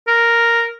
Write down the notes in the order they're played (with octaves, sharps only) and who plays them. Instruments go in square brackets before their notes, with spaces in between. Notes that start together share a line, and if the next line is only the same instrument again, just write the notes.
[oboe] A#4